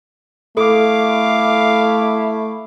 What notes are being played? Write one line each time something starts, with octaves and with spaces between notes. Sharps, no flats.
A3 E4 A4 F5 D6